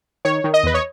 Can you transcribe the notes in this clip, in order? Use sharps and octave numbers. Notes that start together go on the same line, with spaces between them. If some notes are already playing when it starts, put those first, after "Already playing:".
D#3 C#5
D#3
D#5
E2 B4
C#5